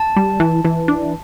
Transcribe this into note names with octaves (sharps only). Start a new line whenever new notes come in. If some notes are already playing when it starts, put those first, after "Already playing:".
Already playing: A5
G3
E3
E3
D4